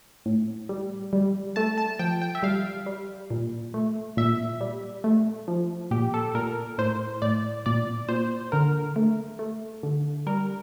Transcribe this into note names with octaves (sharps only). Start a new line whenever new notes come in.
A2
G3
G3
A3 A5
A5
F3 G5
G5
E5
G3 F5
G3
A#2
A3
A#2 E5
G3
A3
F3
A#2 G4
A4
A#2 A#4
A2 C5
A2 D5
A#2 D5
A#2 C5
D3 A#4
A3
A3
D3
G3 A#4